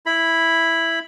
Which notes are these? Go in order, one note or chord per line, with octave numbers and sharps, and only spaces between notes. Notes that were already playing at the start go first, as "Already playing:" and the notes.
E4 B5